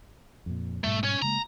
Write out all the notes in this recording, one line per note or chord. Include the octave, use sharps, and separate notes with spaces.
F2 A#2
G#2 B2 G3 A3
C#4 C#5
C#3 G#3 A#3 A#5